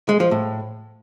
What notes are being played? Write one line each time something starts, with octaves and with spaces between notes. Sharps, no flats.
G#3
F3
A2